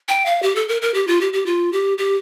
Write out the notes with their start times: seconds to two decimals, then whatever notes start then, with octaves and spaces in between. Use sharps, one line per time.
0.09 G5
0.26 F5
0.43 G4
0.56 A4
0.68 A#4
0.82 A#4
0.94 G4
1.07 F4
1.21 G4
1.33 G4
1.46 F4
1.72 G4
1.98 G4